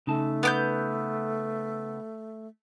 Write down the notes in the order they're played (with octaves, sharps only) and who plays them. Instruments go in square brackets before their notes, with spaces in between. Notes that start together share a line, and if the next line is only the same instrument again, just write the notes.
[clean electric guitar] C#3 D#4 A5 [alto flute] A3
[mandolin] B3 D6 G6